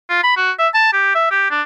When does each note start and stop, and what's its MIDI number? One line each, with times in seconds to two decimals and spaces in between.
0.09 0.21 65
0.23 0.34 83
0.37 0.51 66
0.59 0.68 76
0.74 0.91 81
0.93 1.13 67
1.15 1.30 76
1.31 1.50 67
1.51 1.62 62